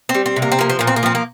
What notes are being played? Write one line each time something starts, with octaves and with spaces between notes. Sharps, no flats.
C4
G3
C4
C3
A#3
C4
F3 A#3
C4
A#2 A#3
C4
A#3
F3 C4
A#3